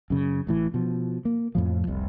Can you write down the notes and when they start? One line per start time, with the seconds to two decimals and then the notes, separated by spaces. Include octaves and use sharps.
0.10 F#2 C#3
0.47 A1 A2 E3
0.74 B2 F3
1.25 A#3
1.55 F2 A2 F3
1.87 F1 C2